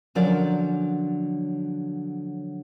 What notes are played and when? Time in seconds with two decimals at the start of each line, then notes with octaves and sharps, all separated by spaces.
0.15 D3 F3 F#3 C#4 A#4 D5